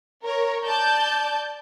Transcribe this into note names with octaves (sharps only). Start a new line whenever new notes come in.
A#4 C#5
D5 A5 G6